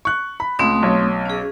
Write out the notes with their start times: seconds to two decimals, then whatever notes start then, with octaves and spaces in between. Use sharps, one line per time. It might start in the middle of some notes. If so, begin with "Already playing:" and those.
0.05 C#6 F#6
0.40 B5
0.59 C#2 A3 C4 D#6
0.83 B1 C#5
1.26 C#4 G#4